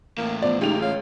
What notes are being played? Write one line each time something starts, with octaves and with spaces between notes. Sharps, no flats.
E2 A2 A#3
F3 B3 D5
C#2 D#4 G4 F7
C#5 F5